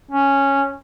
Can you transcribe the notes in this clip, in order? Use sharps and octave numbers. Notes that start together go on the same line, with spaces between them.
C#4